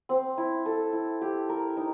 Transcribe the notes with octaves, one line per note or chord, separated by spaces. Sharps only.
C4
E4
A4
E4
G4
A#4
D#4